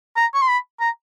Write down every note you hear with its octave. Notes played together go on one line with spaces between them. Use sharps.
A#5
C#6
C6
B5
A#5